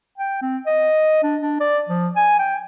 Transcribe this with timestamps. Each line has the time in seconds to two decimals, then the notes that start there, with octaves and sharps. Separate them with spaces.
0.18 G5
0.42 C4
0.66 D#5
1.23 D4
1.42 D4
1.60 D5
1.89 F3
2.16 G#5
2.39 G5